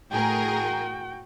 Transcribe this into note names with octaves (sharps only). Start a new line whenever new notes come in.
A2 F#4 G#4 A#4 G5